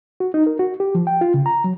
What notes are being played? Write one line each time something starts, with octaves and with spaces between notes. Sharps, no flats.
F#4
D#4
A#4
F#4
G4
F3
G5
F4
C#3
A#5
F#3